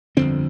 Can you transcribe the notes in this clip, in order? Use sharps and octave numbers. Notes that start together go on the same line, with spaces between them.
G1 F2 D3 C4